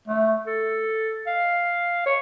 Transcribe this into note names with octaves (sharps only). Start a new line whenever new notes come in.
A3
A4
F5
C#5